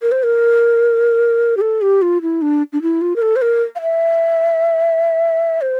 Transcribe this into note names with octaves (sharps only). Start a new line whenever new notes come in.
A#4
C5
A#4
G4
A4
G4
F4
E4
D4
D4
E4
F4
A#4
A4
C5
A#4
F5
E5
C5